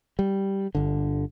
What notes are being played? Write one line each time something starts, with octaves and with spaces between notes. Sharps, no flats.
G3
G1 D3